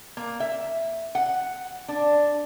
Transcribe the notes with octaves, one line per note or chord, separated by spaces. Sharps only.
A#3
E5
F#5
D4